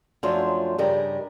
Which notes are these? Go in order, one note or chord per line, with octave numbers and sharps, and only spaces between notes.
F#2 F3 A3 D4 F4 C#5
G2 C#3 G3 G#3 A#4